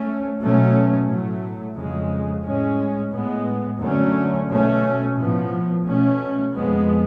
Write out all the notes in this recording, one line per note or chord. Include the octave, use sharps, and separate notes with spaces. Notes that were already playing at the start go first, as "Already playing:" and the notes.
Already playing: A3 C#4
B2 F#3 A3 C#4
A2 F#3 A3
F2 C#3 G#3
A2 G#3 C#4
A2 G#3 B3
F#2 D3 F#3 A3 C#4
B2 A3 C#4
A2 F3 B3
B2 A3 C#4
F2 F3 G#3 B3